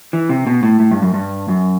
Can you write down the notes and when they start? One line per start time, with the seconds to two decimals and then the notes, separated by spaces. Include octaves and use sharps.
0.13 E3
0.29 C3
0.47 B2
0.63 A2
0.80 A2
0.91 G2
1.02 F#2
1.14 G2
1.48 F#2